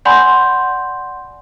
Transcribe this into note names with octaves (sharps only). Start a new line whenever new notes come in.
D5 F#5 G#5 B5 C6 G6